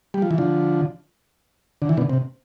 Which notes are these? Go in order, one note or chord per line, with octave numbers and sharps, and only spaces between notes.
G3
F3
E3
D3 F3
D3
E3
B2 D3
C3